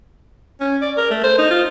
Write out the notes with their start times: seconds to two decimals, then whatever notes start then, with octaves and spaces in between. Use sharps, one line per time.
0.60 C#4
0.82 D5
0.97 A#4
1.11 A3
1.24 C5
1.38 D#4
1.51 F4